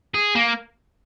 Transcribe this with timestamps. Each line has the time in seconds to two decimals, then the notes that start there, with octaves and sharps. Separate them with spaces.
0.14 G#4
0.35 A#3